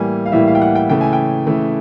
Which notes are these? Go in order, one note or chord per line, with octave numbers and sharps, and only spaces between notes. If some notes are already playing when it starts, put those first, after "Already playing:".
Already playing: A2 E3 G3 A#3 G#5
F5
A2 E3 G3 A#3 E5
F5
G5
F#5
G5
C#3 E3 A3 G5
G#5
G5
C#3 E3 A3